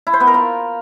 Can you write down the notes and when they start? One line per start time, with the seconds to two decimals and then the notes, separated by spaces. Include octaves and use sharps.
0.07 E4
0.13 C5
0.20 B3
0.27 A#4
0.34 F4